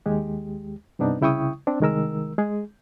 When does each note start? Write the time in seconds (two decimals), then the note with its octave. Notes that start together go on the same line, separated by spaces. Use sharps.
0.06 D#2 G#3 G4
0.99 G2 C3 B3 D4 D#4
1.21 C2 C#3 E4 G5 C#6 D#6
1.67 C4 D4
1.81 C2 D#3 G#3 A#4 E6
2.38 G#3 G#4